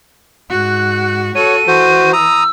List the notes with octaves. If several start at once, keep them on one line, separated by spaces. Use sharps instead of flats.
G#2 F#4 F#6
F#4 A4 C#5 D#7
E3 F#4 C5
A#5 D#6 E6